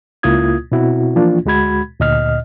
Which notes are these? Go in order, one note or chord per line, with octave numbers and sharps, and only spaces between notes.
C#2 A#3 E4 F4 D#6 G#6
B2 C4 E4 F#4
E3 F3 A#3 D4 F4
D2 G#3 F#4 B5 G#6
D2 A#2 D#5 F6